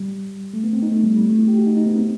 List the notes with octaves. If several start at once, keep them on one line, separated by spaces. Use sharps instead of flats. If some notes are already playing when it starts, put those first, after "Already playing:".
Already playing: G3
A3
B3
C4
D#4
A3
G3
G3
A3
E4
G4
F#4
D#4
D#4
B3
C4